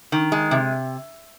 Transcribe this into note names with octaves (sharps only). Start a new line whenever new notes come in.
D#3
G#3
C3